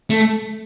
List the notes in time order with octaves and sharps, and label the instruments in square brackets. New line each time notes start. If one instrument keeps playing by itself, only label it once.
[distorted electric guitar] A3